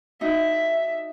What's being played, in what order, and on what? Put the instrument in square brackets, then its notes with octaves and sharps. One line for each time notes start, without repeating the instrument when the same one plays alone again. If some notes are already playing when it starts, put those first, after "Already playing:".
[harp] D#4 F#4 [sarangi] E5